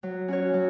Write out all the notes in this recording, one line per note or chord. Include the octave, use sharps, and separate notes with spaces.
F#3
C#4 F#4 C#5
F#3